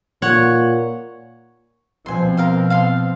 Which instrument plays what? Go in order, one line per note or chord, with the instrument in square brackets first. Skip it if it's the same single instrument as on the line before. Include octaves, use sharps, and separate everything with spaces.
[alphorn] A#2 [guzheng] C#5 F#5
[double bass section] B2 F3 C4 [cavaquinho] G#5 C6
[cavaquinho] A#4 F5 C6
F5 A5 C6